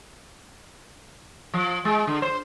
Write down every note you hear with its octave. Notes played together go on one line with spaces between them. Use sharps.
F3
G#3
D3
C5